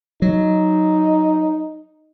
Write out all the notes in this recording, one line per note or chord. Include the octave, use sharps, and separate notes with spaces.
F#3 D#4